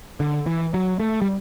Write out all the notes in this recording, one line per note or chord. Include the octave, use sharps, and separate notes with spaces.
D3
E3
F#3
A3
G3